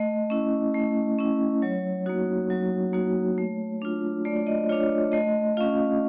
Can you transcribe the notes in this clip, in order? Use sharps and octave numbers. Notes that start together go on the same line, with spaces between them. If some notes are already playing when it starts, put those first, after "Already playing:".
Already playing: A3 D#5
C#4 E4
A3
C#4 E4
F#3 C#5
A#3 D#4 F#4
F#3
A#3 D#4 F#4
A3
D4 F4
A3 D5
D#5
D4 F4 C#5
A3 D#5
C#4 F4 F5